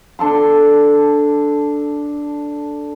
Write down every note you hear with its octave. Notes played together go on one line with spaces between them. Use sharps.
D4 A4 C6